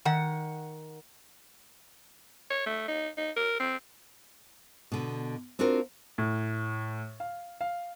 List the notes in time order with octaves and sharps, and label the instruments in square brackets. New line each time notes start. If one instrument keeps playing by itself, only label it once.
[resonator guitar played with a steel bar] D#3 F#5
[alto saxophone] C#5
A3
D#4
D#4
A#4
C4
[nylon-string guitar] B2 D3
C4 D4 F4 F#4 A#4
[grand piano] A2
F5
F5